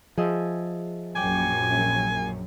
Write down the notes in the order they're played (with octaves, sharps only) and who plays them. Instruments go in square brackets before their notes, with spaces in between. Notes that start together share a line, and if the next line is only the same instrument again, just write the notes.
[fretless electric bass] F3 [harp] G#4 D#5 E5
[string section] A#1 F#2 [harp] G5 D6 [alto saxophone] G#5